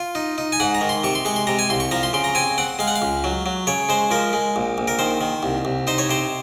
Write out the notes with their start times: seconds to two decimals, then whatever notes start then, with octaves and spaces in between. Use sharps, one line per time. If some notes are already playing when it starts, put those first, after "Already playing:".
Already playing: F4 F5
0.15 D#4
0.38 D#4
0.52 G#5
0.60 G#2 F#5
0.75 A#5
0.81 D#3
0.89 C6
1.04 C3 C#6
1.15 C6
1.25 G#3 C#6
1.36 C6
1.47 C3 A#5
1.59 G#5
1.70 C2 C6
1.80 C#6
1.91 F3 A#5
2.03 C6
2.13 C#3 C6
2.24 A#5
2.35 C4 G#5
2.58 C4 F#5
2.79 G#3 F5
2.88 F#5
2.96 F5
3.02 C#2
3.24 F#3
3.46 F#3
3.67 C#3 C#5
3.89 G#3 C5
4.11 F3 A#4
4.33 G#3
4.56 A#1
4.78 A#1
4.88 A#4
4.99 D#3 C5
5.21 D#3
5.43 C2
5.65 C2
5.87 D#4 C5
5.98 C#5
6.10 C3 C5